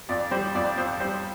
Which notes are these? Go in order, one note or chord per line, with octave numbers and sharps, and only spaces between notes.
F2 D5
G3 C5
F2 D5
F2 C5
G3 C5